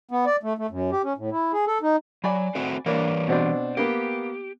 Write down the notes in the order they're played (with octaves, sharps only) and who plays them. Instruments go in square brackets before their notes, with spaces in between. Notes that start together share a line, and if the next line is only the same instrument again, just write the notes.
[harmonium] B3
D5
A3
A3
F#2
G4
C#4
A2
E4
G#4
A4
D#4
[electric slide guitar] F#3 [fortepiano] D5 G#5 B5
[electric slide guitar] A3 C4 F#4
[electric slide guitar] E3 G3 C#5 [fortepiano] A#3 D4
[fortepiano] B2 C4 D4
[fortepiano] A#3 B3 [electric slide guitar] G4